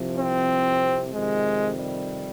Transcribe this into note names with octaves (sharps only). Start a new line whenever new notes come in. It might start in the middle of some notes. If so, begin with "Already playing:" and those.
Already playing: C2 C3 F3
C4
F2 C3 D#3 G#3
G3